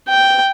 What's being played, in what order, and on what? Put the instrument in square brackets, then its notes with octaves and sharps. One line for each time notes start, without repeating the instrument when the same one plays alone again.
[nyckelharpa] G5